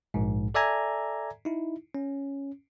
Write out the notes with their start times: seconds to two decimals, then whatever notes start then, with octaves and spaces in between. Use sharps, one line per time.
0.14 A#1 G#2
0.54 A4 D5 E5 G#5 A#5 G#6
1.45 D#4 E4
1.95 C#4